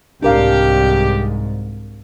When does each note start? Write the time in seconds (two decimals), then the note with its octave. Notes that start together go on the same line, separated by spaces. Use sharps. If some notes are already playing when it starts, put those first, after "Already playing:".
0.23 C2 G#2 D4 G4 A#4 F5